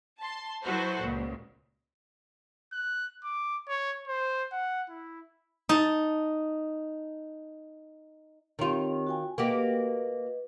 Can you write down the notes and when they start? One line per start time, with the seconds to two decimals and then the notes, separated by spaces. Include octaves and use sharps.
0.19 A5 C6
0.62 F#3 E4 F#4 A4 B4 C5
1.00 C#2 A#2
2.73 F#6
3.24 D6
3.68 C#5
4.08 C5
4.52 F#5
4.89 E4
5.69 D#4 A5
8.59 D#3 C4 F4 G4 C#5
9.07 F#4 G5 G#5
9.38 A#3 F#4 G4 B4 D#5